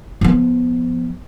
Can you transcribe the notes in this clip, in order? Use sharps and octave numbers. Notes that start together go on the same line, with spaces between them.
F3 B3